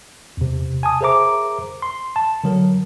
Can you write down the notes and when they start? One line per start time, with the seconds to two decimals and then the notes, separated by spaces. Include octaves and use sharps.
0.37 E2 C3
0.83 G#5 A5 D#6
1.01 G#4 A#4 C5 E5 A#5 D6
1.82 C6
2.16 A5
2.44 D3 F#3 A#4